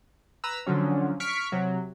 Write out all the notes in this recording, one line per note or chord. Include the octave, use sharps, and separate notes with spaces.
B4 A#5 E6
D3 F3 F#3 C#4
C#6 F6 B6 D7
C3 F#3